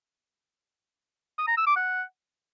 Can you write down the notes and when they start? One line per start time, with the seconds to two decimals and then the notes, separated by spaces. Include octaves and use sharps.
1.38 D#6
1.47 A#5
1.57 E6
1.66 D6
1.76 F#5